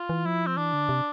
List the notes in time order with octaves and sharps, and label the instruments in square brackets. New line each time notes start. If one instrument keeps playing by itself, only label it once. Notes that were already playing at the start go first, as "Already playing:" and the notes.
Already playing: [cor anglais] F4
[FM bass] E3
[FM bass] F3 [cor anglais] E4
[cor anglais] C4
[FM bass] E3 [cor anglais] D4
[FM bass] D3
C3